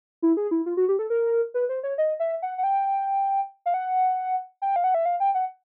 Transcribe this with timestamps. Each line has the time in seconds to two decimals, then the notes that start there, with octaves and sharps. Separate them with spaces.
0.22 E4
0.37 G#4
0.51 E4
0.66 F4
0.77 F#4
0.89 G4
0.99 A4
1.10 A#4
1.54 B4
1.69 C5
1.83 C#5
1.98 D#5
2.20 E5
2.42 F#5
2.58 F#5
2.64 G5
3.66 F5
3.74 F#5
4.62 G5
4.76 F5
4.84 F#5
4.94 E5
5.06 F5
5.20 G5
5.35 F#5